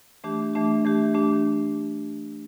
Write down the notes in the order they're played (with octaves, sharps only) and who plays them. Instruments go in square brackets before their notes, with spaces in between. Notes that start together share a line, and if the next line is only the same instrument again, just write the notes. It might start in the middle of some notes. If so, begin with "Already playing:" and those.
[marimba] E3 A3 D4 G4
E3 A3 D4 G4
E3 A3 D4 G4
E3 A3 D4 G4